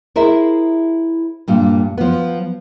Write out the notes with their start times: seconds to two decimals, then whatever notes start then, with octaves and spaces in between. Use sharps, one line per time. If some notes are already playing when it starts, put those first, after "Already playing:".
0.16 E4 G#4 A#4 C5 E5
1.48 G2 A#2
1.98 F3 B3